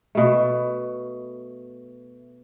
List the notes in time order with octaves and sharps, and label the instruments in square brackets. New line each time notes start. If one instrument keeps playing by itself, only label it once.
[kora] B2 A3